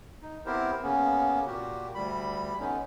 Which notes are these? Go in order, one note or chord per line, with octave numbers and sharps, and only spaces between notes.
D#4
B3 C4 E4 G4 A#4 C5
C#3 A#3 B3 C#4
A#2 A#3 F#4 G4
D2 G3 B5
D3 B3 C#4 D#4